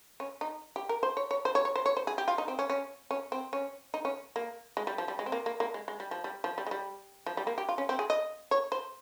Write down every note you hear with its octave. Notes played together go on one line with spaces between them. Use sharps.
C#4
D#4
G4
A#4
C5
C#5
C#5
C5
C#5
C#5
C5
C#5
C5
G#4
G4
F4
D#4
C4
C#4
C#4
C#4
C4
C#4
D#4
C#4
A#3
G#3
G3
F3
G3
G#3
C4
A#3
A#3
A#3
G#3
G#3
G3
F3
G3
F3
G3
G#3
G3
F3
G3
A#3
G4
F4
C#4
C4
G#4
D#5
C#5
C5